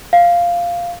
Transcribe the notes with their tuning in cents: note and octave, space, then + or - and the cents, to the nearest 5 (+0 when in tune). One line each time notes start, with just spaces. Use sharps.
F5 -5